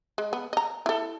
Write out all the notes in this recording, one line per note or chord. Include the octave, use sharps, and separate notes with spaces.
G#3
B3
D#5 A#5
E4 A4